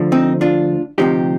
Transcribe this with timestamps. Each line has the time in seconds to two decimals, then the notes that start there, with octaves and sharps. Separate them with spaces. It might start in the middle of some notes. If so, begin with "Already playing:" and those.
Already playing: D2 D3 F3
0.12 C4 D#4
0.41 D4 F4
0.98 D2 C3 F3 D#4 G4